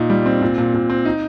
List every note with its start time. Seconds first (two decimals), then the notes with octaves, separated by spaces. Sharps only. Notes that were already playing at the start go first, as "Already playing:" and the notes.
Already playing: A#2 D#4
0.10 G3
0.26 C4
0.41 A#2
0.58 A#2
0.74 A#2
0.90 C4
1.05 D#4